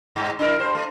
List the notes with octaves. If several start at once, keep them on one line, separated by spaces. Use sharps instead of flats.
G2
D4 E4 A#4
G2 C5
A3